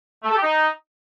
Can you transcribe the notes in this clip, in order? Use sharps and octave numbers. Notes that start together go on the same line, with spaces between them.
A3
A4
G4
D#4